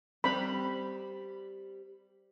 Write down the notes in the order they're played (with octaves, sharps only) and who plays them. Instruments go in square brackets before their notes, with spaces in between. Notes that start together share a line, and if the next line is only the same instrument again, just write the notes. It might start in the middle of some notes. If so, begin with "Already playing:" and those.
[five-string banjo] G3 C4 [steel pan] B5